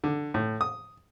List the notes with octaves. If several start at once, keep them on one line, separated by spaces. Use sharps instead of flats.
D3
A2
D#6